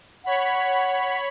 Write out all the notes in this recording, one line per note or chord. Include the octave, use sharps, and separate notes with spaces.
C#5 F#5 B5 B6